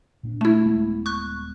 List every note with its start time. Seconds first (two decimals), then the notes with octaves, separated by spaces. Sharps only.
0.23 A#2 C4 D4
0.41 A3 E4
0.66 D#1 G#3 B3
1.06 C#6 F#6